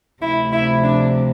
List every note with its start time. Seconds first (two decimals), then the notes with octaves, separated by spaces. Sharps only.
0.21 D2 C3 F3 E4
0.52 E4
0.83 D4